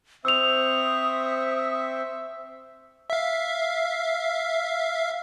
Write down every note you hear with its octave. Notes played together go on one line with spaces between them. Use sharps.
C4 C5 E5 C#6 D#6 E6 F7
E5 F5